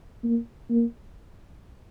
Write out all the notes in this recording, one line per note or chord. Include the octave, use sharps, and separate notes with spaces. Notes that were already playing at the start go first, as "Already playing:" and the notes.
A#3
A#3